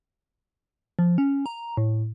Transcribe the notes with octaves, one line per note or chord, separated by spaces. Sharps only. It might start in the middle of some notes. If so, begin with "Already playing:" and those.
F3
C#4
A#5
A2